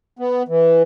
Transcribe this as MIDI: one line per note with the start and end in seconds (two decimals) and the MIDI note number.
0.19 0.43 59
0.48 0.82 52